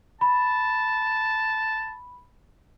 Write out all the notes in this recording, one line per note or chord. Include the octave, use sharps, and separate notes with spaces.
A5 B5